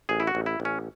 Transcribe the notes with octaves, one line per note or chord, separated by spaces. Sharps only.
A1 G#4
E4
F#4
A1
E4
A1
C#4